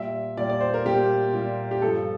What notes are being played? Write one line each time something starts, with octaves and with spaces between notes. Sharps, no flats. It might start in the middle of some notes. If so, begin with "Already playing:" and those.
Already playing: A#2 G3 E5
A#2 G3 D5
D5
C5
A#4
A#2 G3 G4
A#2 G3
G4
G2 F3 A4